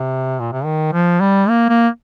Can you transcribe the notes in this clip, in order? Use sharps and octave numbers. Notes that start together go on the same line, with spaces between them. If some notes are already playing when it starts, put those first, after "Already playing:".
Already playing: C3
A#2
C3
D#3
F3
G3
A#3
A#3